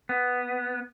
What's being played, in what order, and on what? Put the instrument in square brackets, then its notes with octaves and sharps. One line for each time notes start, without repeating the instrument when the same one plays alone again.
[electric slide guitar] B3